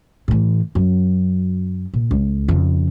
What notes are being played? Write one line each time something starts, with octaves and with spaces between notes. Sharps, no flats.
A2 E3
F#2 F#3
A#2
C#2
F2 C#3